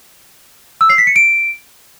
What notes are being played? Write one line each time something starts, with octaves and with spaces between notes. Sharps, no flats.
E6
C7
B6
C#7
D7